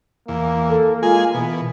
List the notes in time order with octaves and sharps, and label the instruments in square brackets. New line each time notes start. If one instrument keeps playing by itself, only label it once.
[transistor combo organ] E2 [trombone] A#3
[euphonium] A4
[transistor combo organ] G#3 G#4 G#5 [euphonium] F4
[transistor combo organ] B2 [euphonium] E3